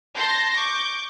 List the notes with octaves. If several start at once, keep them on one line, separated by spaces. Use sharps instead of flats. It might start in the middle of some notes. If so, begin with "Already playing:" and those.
A5 C6 G6 A#6
C#6 D6 G6